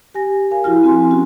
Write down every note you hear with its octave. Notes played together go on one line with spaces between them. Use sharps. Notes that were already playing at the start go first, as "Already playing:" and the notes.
G4 G#5 A#6
A#4 F5 G#5
F3 E4 F#4 F6
C4 F#4 G#5 C6
C#4 F#4